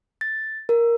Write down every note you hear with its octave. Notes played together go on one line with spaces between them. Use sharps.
A6
A#4